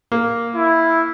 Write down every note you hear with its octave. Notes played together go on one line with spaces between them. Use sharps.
A#3
E4